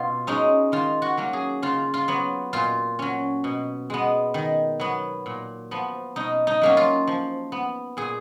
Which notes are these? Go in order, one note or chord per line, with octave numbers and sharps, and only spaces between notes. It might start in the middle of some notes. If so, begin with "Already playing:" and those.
Already playing: B2 F4
G#3 C#4 D#4
D#3 F4
F#4
F#3 A#3 C#4
G#4
C#3 F4
F4
F#3 B3
A#2 F4
F#3 C#4
B2
G#3 B3
D#3
F#3 B3
A#2
F3 B3
B2 D#4
D#4
F#3 A#3 C#4
F4
F3
B3
A#2 G#4